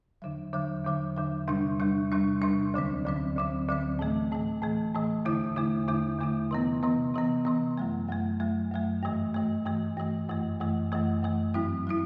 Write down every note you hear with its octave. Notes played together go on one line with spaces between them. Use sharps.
E2 D3 F#3
E2 D3 F#3
E2 D3 F#3
E2 D3 F#3
E2 C3 G3 D4
E2 C3 G3 D4
E2 C3 G3 D4
E2 C3 G3 D4
D2 D3 F#3 C4
D2 D3 F#3 C4
D2 D3 F#3 C4
D2 D3 F#3 C4
A2 E3 A3
A2 E3 A3
A2 E3 A3
A2 E3 A3
E2 D3 A3 E4
E2 D3 A3 E4
E2 D3 A3 E4
E2 D3 A3 E4
C3 E3 B3
C3 E3 B3
C3 E3 B3
C3 E3 B3
F#2 F#3 A3
F#2 F#3 A3
F#2 F#3 A3
F#2 F#3 A3
G2 E3 A3
G2 E3 A3
G2 E3 A3
G2 E3 A3
F#2 E3 A3
F#2 E3 A3
F#2 E3 A3
F#2 E3 A3
G2 F#3 C4 E4
F#3 C4 E4